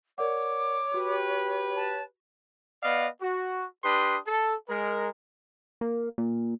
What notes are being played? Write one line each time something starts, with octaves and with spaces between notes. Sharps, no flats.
A#4 C#5 D5 F#5 D6
F#4 G4 B4
A5
B3 D5 D#5 F5
F#4
D4 G4 B4 C6 D#6
A4
G#3 A#4
A#3
A#2